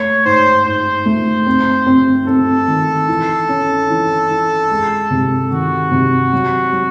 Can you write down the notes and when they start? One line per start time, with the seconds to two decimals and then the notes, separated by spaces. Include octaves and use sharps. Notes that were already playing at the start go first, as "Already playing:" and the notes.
Already playing: A3 C#5
0.25 G#2 C5
0.65 G#2 C5
1.06 A3
1.46 C4
1.87 C4
2.28 C4 A4
2.68 D#3
3.08 E3
3.49 C#4
3.90 E3
4.30 E3
4.71 G#3
5.11 C3
5.51 D#3 F#4
5.92 C3
6.33 F#3
6.72 F#3